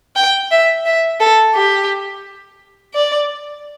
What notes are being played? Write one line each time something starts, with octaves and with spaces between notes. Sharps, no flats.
G5
E5
E5
A4
G4
D5